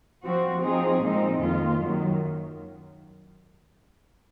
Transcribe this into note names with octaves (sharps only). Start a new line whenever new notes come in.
F3 C4 F#4
F3 C4 D#4 G#4
A#2 F3 G#3 C4 D#4
F2 D#3 A#3 F4
F#2 D#3 F#3